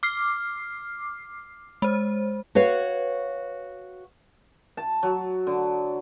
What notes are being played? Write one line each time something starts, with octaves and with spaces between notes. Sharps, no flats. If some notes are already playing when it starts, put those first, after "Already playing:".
D6 F6 C7
G#3 C5
F#4 B4 C#5 F5
A5
F#3
D3